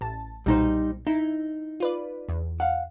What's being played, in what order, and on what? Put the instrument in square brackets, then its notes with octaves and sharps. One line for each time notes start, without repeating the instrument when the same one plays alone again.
[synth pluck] A1 A5
[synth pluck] B1 A#2 [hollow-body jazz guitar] G3 D#4 C5
[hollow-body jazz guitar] D#4 [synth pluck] E4
[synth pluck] F4 B4 D5
E2
[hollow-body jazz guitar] F5 F#5